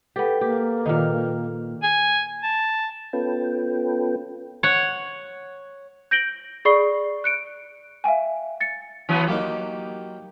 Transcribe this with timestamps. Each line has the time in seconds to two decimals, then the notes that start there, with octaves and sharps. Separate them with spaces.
0.16 B3 G4 A4 B4 G5
0.41 A#3 G4
0.86 A#2 D#3 D#4 F6
1.83 G#5
2.43 A5
3.13 B3 C#4 F4 A4 B4 G5
4.63 C#5 F#5
6.11 G6 A#6 D7 F#7 G7
6.65 G#4 D5 B5 C#6 C7 G7
7.24 F#6 C#7 D7
8.04 E5 F5 G5 G#5
8.60 A6 C#7
9.09 E3 F#3 B3
9.27 F#3 A#3 D#4 G4